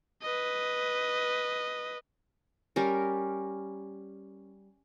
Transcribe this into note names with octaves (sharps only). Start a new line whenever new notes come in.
B4 D#5
G3 C#4 A#4